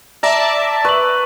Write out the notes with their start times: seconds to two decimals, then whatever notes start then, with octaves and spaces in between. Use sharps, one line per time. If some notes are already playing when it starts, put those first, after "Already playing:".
0.23 D5 E5 A5 A#5
0.85 B4 C#6 F#7